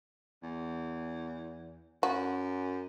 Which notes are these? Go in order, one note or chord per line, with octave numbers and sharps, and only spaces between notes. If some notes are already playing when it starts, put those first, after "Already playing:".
E2
F#2 F#4